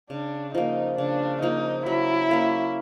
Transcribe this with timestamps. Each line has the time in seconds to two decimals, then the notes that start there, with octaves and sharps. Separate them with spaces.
0.10 C#3 D4
0.54 F3 A#3 D#4
0.98 C#3 D4
1.42 F3 A#3 D#4
1.86 F#3 E4
2.31 A#3 C#4